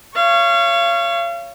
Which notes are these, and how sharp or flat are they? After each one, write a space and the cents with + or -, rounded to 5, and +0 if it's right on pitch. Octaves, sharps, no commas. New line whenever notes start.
C#5 +0 F5 -30